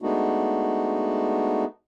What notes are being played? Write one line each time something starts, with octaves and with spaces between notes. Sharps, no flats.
G#3 A3 B3 D4 D#4 F#4